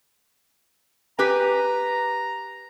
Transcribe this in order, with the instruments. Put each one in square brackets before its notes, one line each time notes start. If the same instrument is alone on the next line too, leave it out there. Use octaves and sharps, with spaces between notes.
[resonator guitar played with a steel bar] G4 B4 G#5 [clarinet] A#5